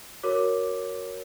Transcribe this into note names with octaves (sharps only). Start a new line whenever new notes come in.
F#4 A#4 C#5 D6